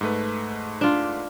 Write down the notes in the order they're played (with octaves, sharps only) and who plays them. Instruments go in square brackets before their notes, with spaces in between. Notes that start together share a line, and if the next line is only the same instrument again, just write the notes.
[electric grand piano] G#2 A3 B4
[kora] D4 F4